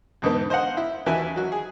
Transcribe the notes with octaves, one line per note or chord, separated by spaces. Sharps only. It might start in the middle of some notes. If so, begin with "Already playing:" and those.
E2 G#2 D3 B3
C5 D#5 F5 F#5
E4
D#2 E3 F#4 E5 G#5 F#6
F#3 F#4
G#4